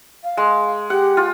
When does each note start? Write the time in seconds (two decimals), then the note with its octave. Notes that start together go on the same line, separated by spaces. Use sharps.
0.24 F5
0.37 G#3
0.90 G4 F#5
1.17 F4